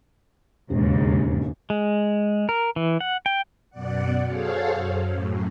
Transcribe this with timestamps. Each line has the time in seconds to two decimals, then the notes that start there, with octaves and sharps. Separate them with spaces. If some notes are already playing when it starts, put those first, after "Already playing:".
0.70 E1 D#2 G#2 C#3
1.70 G#3
2.49 A#4
2.76 E3
3.01 F#5
3.26 G5
3.70 F#2 B2 D5 F#5
4.26 F#4 G#4 A4 C5 C#5 F5
4.74 F#2
5.11 F#2 A2